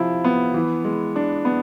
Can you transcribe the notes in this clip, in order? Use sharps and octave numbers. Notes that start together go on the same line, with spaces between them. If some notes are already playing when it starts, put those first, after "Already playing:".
Already playing: C3 F3 E4
B3
E3
G#3
D4
B3